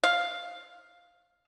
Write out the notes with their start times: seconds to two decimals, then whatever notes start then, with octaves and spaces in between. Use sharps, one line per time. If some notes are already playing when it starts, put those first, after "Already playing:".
0.04 F5